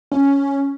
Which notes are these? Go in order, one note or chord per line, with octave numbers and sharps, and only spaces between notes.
C#4